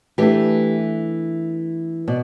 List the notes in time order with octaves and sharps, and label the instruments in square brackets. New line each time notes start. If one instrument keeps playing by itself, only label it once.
[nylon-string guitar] E3 A3 D4 G4
B2 D5